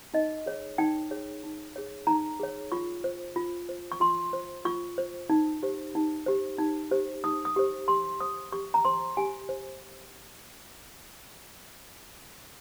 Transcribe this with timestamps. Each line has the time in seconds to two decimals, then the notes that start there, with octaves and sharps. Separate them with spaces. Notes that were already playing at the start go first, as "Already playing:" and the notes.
0.14 D#4 D#5
0.46 G#4 C#5
0.78 D#4 G5
1.11 G#4 C#5
1.43 D#4
1.76 G#4 C#5
2.07 D#4 A#5
2.40 G#4 C#5
2.72 F4 C#6
3.04 C5
3.36 F4
3.69 C5
3.92 C#6
4.00 F4 C6
4.33 C5
4.65 F4 C#6
4.98 C5
5.30 D#4
5.63 G4 C5
5.95 D#4
6.26 G4 C5
6.58 D#4
6.91 G4 C5
7.24 D#4 D#6
7.45 D#6
7.56 G4 C5
7.88 G4 C6
8.20 C5 D#6
8.52 G4 C#6
8.74 A#5
8.85 C5 C6
9.17 G4 G#5
9.49 C5